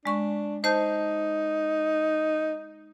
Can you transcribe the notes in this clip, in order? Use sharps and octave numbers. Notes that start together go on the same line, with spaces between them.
G#3 D4 C#6
D#4 C5 A5 G6